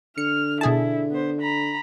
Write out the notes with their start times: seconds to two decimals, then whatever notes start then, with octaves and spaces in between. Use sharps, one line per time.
0.18 D3 F6 C#7
0.61 B2 E4 G#4 A5
1.11 B3 C5
1.41 A#5 B5